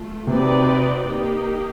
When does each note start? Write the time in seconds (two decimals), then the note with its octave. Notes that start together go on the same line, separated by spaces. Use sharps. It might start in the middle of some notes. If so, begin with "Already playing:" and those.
Already playing: A3 F4
0.27 C3 C4 D#4 F#4 B4 D5
1.07 A#3 D#4 G4